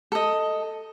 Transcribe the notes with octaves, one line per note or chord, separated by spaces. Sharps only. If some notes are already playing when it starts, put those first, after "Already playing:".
A4 D#5